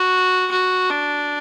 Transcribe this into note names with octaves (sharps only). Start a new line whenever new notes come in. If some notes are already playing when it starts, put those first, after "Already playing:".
Already playing: F#4
F#4
D4